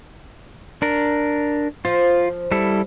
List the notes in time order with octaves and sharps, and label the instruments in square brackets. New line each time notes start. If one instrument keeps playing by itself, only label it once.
[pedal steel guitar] D4 A#4
[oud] F3 [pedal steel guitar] F4
[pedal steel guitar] G3 E4 A4